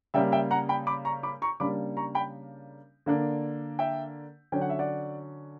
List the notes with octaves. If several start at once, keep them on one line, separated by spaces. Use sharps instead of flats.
C#3 G3 A#3 E5 G5
E5 G5
F#5 A#5
G5 B5
B5 D6
A#5 C#6
B5 D6
A#5 C#6
C#3 G3 A#3 D4 B5 D6
A#5 C#6
G5 B5
D3 A#3 D4
E5 G5
D3 F#3 C#4 G5
F#5
E5
D5 F#5